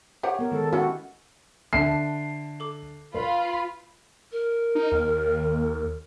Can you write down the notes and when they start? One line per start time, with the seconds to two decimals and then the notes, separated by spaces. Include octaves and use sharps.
0.23 G4 C5 C#5 F#5
0.39 B3 A#4
0.51 D#3 G#3 A4
0.73 C#4 E4 F#4 G4 A4 F#5
1.73 D3 E5 A5 C7
2.60 A4 D6
3.15 F4 B4 B5
4.32 A#4
4.75 D#4
4.92 D#2